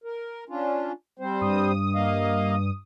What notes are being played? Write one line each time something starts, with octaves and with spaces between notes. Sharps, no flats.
A#4
C#4 D4 F4
G3 C4 C5
G2 D#6
A#3 D#5 F5